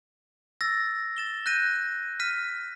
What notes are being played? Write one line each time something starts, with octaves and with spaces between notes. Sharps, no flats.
E6 A6 A#6
A6 E7 G7
F#6 G6 A#6 D#7
F6 B6 D#7